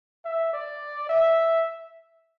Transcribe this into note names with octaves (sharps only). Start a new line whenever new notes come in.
E5
D5
E5